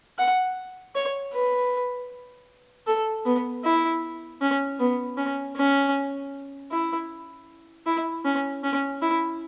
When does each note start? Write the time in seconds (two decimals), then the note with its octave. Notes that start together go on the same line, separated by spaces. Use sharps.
0.19 F#5
0.95 C#5
1.33 B4
2.87 A4
3.26 B3
3.64 E4
4.42 C#4
4.80 B3
5.18 C#4
5.56 C#4
6.71 E4
7.86 E4
8.25 C#4
8.63 C#4
9.02 E4